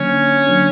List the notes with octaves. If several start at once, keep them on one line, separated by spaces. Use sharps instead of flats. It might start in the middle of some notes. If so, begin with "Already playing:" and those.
Already playing: D3 F#3 A#3 C#4 D4
D3 F#3 A#3 D4